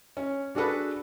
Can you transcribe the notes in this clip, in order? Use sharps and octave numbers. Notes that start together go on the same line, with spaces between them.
C#4
D4 F#4 G#4 A4 B4